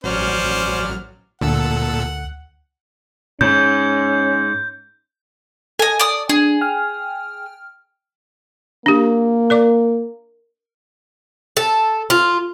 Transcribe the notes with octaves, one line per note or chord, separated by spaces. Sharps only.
A1 F#3 C#4 C5 D5 F6
D2 A#2 A4 F#5 E6
G#2 C#4 G6
A4 D#5 G#5
D5 D#6
D4 G#4
G5 F6
A#3 D4 G4
A#4 D5 D6
A4
F4